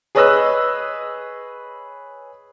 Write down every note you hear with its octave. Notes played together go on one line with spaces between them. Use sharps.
G#4 B4 C#5 D#5 E6 F#6